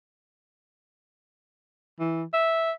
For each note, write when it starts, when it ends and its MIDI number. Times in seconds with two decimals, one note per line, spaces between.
1.99 2.23 52
2.33 2.71 76